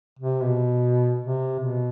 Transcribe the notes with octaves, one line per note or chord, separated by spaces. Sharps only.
C3
B2
C3
B2